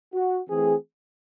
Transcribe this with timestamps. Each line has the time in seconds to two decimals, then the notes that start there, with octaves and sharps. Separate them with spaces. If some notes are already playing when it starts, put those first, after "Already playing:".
0.14 F#4
0.50 E3 A3 C4 G#4